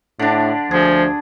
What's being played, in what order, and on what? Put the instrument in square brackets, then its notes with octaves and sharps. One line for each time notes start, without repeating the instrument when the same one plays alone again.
[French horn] A2 [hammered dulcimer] D3 D4
[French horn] D2 [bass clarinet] F3 [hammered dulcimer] G#4